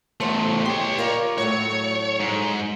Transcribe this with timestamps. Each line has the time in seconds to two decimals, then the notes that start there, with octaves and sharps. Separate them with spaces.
0.21 E2 A3 C5 C#5
0.66 G4 C#5 C6
0.98 F4 A#4 D5
1.38 A2 F#3 A3 C#5
2.20 G#2